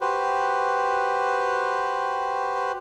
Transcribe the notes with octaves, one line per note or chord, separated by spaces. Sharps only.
F#4 G4 B4 C5